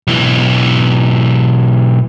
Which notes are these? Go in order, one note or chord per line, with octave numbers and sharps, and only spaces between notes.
B1 E3